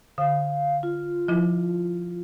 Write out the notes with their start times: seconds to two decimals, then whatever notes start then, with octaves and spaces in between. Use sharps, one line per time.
0.18 D3 F5
0.83 F4
1.28 F3 E4